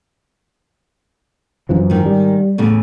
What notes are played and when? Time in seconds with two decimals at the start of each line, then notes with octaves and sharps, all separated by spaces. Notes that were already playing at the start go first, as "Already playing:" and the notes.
1.69 F#2 E3 F3
1.90 G#2 D#3
2.06 G3
2.58 E2 A2 C#3